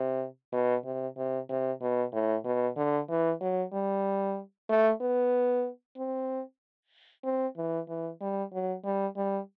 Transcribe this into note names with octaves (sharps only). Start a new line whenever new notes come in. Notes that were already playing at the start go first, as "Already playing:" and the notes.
Already playing: C3
B2
C3
C3
C3
B2
A2
B2
D3
E3
F#3
G3
A3
B3
C4
C4
E3
E3
G3
F#3
G3
G3